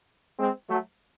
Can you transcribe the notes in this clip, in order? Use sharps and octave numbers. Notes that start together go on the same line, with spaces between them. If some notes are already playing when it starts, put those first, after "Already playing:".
G#3 C4
F#3 A3